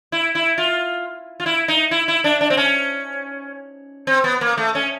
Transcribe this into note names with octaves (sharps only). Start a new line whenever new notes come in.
E4
E4
F4
F4
E4
D#4
E4
E4
D4
D4
C4
C#4
C4
B3
A#3
A3
C#4